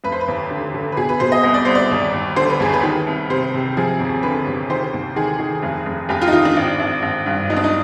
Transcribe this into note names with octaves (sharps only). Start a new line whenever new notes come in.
F1 B4
C5
B4
D#2
D3
D3
B4
B2 G#4
B4
B2 C5
D#5
C2 D#5
D5
C2 C5
D5
D#2
D#2
D3 C5
B4
D#2 G#4
B4
D#3
C2
C3 C5
C3
F3 G#4
D#2
D3 B4
D#2
D#3 C5
D#2
D#3 G#4
D#3
F1
F1
F1 G4
F4
D#4
D#3 F4
D4
G#1
G#1
G#1
G2
B1 D#4
D4
D#4